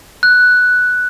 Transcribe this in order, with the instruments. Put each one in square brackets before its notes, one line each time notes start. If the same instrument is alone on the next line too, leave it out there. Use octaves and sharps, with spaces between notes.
[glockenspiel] F#6